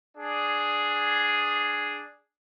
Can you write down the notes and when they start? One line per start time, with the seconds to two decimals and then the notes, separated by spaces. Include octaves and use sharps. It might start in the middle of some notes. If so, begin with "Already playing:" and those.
0.17 D4 G#4